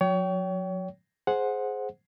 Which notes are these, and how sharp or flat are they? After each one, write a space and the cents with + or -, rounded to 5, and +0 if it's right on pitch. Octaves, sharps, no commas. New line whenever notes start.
F#3 -35 C#5 +30 G5 -25
G#4 +15 C5 +0 F#5 -10